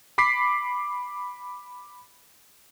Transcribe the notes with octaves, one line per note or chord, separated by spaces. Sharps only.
B5 D6 B6 C7